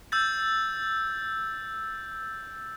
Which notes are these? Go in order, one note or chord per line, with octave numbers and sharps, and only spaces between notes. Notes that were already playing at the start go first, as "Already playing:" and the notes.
E6 G6 A6